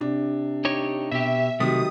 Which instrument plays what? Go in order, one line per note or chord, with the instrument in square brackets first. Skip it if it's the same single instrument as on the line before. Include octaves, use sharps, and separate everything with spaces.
[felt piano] C3 D4
[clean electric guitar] D#4 G4 C#5
[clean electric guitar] B2 G4 [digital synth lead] E5
[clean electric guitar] C3 A3 [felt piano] D#3 F#3 G3 [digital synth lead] D#6